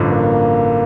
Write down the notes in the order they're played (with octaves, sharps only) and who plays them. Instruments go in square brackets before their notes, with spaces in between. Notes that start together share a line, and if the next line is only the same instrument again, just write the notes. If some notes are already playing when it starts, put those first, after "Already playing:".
Already playing: [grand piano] A1 G2 D3 F3
[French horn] A#3